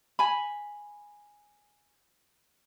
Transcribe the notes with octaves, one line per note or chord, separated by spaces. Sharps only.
G#5 B5